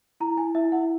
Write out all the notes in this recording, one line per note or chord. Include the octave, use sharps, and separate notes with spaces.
E4 A#5
E4 G#5
E4 E5
E4 F#5